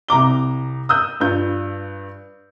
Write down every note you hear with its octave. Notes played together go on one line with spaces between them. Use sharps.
C2 A#5 D6 G7
D#6 E6 F#6 G6
G2 F4 G6